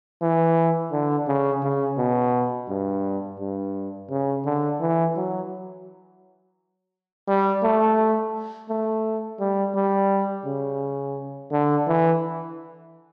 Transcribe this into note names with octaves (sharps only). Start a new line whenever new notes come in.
E3
D3
C#3
C#3
B2
G2
G2
C#3
D3
E3
F#3
G3
A3
A3
G3
G3
C#3
D3
E3